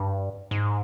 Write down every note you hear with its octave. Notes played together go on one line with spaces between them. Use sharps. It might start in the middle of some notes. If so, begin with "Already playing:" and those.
Already playing: G2
G#2